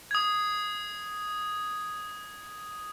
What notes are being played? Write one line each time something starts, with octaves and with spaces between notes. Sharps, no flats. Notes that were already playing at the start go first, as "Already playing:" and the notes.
D#6 G#6